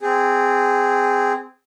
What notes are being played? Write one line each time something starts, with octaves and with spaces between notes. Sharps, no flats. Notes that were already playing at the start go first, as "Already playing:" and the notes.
C4 G#4